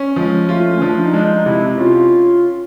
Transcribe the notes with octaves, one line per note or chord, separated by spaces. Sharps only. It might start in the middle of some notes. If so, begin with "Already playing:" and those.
Already playing: C#4
F3 G#3
A3 F4
C#4
F3 D4
D#4
G#3 D4
D#4
C3 E4
C#4 F4